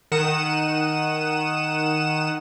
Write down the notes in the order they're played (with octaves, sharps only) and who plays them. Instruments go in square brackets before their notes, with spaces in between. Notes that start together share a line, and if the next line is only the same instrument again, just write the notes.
[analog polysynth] D#3 F#5 D#6 E7